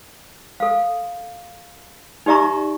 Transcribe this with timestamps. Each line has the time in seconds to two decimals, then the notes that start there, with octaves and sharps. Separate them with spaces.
0.60 A4 F5
2.26 D#4 G4 D5 E5 A#5 C#6